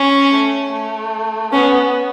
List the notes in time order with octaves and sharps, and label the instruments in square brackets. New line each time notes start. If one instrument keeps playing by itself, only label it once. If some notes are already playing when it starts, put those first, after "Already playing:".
Already playing: [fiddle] C#4
[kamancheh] A3
A3
[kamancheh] B3 [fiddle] C#4